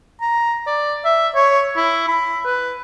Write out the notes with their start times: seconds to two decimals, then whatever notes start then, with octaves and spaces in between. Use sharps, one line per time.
0.21 A#5
0.67 D5
1.05 E5
1.35 C#5
1.77 E4
2.08 B5
2.45 B4